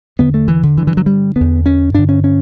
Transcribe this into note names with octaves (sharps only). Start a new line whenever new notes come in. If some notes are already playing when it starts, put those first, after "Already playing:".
E2 D3 B3
A3
E3
D3
G2 D3 E3
E3
F#3
G3
E2 D3 B3
C#4
G2 D3 D4
C#4
C#4